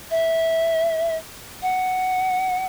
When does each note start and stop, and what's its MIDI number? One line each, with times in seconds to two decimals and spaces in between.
0.11 1.16 76
1.62 2.66 78